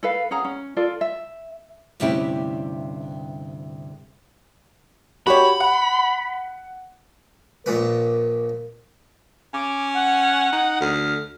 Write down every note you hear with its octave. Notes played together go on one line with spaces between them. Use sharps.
A4 B4 F5
C#4 G#4 F#5 A#5
C#4
F4 A4 D5
E5
D2 G2 C3 C#4 E4 G4
F#4 G4 C#5 B5
F#5
A#1 A#2 A#4 B4
C#4 D6
F#5
D#4
D2 F6